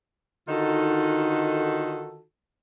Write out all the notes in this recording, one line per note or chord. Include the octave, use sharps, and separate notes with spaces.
D3 D#3 D#4 F4 F#4 A4